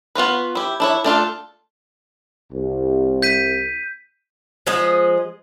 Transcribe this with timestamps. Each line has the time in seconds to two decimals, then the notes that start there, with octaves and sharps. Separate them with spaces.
0.15 B3 F4 F#4 B4
0.55 E4 G4
0.80 D4 E4 C#5
1.04 A3 D4 F4 A4
2.53 C2
3.22 G6 B6 D#7
4.67 F3 G#3 D#5